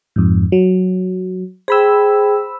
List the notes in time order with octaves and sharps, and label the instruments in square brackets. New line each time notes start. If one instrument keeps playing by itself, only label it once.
[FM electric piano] F2 G#2
F#3
[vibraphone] G#4 G5 [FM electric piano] C5 B5 E6